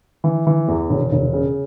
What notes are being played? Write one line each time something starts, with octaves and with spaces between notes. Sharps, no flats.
E3
E3
E2
E1
E1
C#3